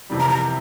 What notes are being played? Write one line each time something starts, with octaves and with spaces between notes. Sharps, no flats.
F2 C3 E3 G3
A#5
A#5